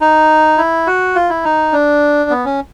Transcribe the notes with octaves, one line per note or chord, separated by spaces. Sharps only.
D#4
E4
F#4
F4
E4
D#4
D4
B3
C#4